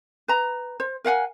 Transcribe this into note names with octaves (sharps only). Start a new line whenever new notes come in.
B4 A#5
C5
A#4 F5 F#5 G#5